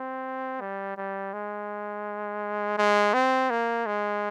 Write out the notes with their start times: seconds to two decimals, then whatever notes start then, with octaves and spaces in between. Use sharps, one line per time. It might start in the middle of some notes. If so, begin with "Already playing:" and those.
Already playing: C4
0.61 G3
0.97 G3
1.33 G#3
2.78 G#3
3.14 C4
3.50 A#3
3.86 G#3